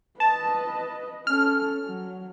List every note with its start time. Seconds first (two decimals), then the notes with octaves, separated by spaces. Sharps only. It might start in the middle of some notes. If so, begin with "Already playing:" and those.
0.20 B4 D#5 A5
1.27 C#4 A4 F6
1.86 F#3